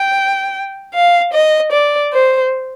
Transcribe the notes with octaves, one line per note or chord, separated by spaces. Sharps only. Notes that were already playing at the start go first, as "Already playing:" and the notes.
Already playing: G5
F5
D#5
D5
C5